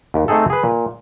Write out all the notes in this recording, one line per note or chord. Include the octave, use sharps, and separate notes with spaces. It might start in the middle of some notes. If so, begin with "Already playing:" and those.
D#2
A3 C4 D#4 G#4 A4
G#4 B4
A#2